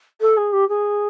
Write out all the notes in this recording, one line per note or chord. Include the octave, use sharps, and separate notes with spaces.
A4
G#4
G4
G#4